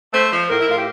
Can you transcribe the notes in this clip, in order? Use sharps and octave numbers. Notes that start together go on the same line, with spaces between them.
A3 C5
F3
A2 A#4
E4
A2 F4
G4